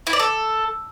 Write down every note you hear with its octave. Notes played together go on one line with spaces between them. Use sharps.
E4
D5
A4